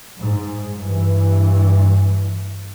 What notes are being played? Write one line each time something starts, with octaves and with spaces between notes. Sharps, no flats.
G#2
G2 E3